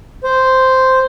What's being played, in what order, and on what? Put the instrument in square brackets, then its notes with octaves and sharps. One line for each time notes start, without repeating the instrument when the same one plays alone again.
[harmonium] C5